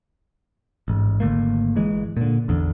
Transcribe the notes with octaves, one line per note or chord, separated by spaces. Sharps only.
A1 G#2
G#1 D3 A3 A#3
G1 E3 G#3
A#2 D3
A1 E2 D3